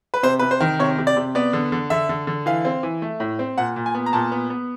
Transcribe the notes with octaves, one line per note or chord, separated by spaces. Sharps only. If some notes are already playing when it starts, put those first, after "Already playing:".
B4
C3 C5
C3 B4
C5
D#3
C3 C#5
C3
D5
C3
B3 D5
D3
D3
D3 E5
D3
D3
E3 F5
C4
E3
A3
A2
C4
A#2 F#5
A#2
G#5
B3
A#5
A#2 A5
B3
B3